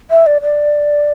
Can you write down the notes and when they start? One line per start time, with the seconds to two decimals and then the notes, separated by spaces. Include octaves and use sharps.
0.10 E5
0.26 D5
0.42 D5